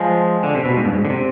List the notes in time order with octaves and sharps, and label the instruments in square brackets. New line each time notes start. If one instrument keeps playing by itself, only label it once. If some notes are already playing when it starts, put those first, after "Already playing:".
Already playing: [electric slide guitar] F3 G#3
D3
C3
B2
G#2
G2
G#2
D3
C3